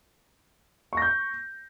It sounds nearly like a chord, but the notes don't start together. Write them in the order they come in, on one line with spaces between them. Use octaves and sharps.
C#6 A#6 G6